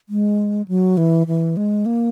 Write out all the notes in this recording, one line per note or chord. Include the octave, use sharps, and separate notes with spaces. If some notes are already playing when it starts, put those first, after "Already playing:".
G#3
F#3
E3
E3
G#3
A#3